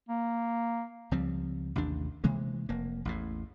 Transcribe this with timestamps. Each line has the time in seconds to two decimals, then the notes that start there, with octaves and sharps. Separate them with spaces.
0.09 A#3
1.11 C#2 F3 G3 C4
1.76 A1 D#2 C3 D4
2.24 C3 E3 G#3 A#3
2.69 F1 A#3
3.05 A1 E2 A2